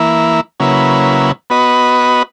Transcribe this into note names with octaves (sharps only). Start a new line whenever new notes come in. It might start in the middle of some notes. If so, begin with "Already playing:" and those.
Already playing: E3 A#3 E4
C#3 F#3 A#3 E4 B4
B3 F#4 B4 D#5